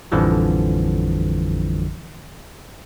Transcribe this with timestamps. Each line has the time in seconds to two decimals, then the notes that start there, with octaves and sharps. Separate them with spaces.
0.12 A1 F2 D3 E3 F3 G3